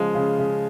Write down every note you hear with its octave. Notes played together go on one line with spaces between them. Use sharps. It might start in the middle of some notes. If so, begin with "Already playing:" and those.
Already playing: C#3 F3 G#3
C#3
C#3